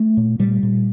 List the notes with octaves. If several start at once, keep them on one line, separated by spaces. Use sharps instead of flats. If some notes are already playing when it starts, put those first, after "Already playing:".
Already playing: A3
A#2
A#2 G3
A#2